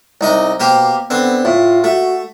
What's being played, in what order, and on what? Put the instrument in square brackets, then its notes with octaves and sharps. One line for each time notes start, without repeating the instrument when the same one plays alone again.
[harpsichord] C2 D#4 D#5
[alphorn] B2 [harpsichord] A#3 G4 C5
[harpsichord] D3 C4 [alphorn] B3
[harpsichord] A2 [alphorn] F4
[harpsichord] A3 [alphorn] F#4